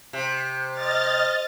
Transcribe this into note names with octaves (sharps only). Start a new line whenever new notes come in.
C3
D#5 F6 A6